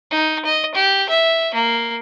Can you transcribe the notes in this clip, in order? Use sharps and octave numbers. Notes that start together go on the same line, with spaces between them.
D#4
D#5
G4
E5
A#3